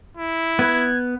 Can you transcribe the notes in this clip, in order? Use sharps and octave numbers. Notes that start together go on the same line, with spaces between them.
E4
B3 B4 B5 G#6